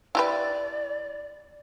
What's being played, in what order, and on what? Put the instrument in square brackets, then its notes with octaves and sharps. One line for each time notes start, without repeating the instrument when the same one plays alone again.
[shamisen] E4 G4 B4 [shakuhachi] D5